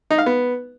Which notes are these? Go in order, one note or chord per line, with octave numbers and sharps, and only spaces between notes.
D#4
F5
B3